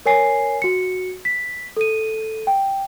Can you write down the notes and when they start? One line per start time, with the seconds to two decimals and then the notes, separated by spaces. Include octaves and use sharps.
0.06 A#4 C#5 G#5 C7
0.62 F#4 C#7
1.25 B6
1.77 A4 D#7
2.47 G5